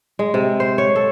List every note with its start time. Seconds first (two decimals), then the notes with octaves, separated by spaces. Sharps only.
0.19 G#3
0.34 C3
0.60 C5
0.78 C#5
0.96 A4